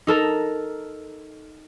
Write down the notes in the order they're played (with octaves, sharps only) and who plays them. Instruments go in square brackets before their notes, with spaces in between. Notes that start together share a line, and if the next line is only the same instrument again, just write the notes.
[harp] D#4 A4 A#4